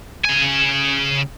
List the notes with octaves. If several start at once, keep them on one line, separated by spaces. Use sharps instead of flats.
C#3 G#5